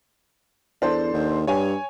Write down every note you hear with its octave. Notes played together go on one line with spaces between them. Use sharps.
E2 D4 A4 C5
D#2
G2 C#5 G#5